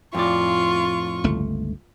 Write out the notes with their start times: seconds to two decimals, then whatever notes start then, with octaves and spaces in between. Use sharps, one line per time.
0.15 F2 A2 F4 D5 C#6
1.24 G1 C#2 A3